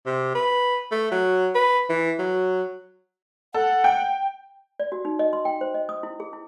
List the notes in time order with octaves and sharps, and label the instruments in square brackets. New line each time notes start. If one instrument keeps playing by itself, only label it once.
[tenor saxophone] C3
B4
A3
F#3
B4
E3
F#3
[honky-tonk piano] A4 [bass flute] F#5
[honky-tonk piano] G5
[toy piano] D5
F#4
D#4
D#5
C6
G5
C5
D#5
D#6
E4
G#4
E4